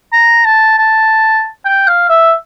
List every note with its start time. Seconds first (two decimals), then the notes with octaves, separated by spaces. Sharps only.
0.13 A#5
0.45 A5
0.78 A5
1.65 G5
1.87 F5
2.09 E5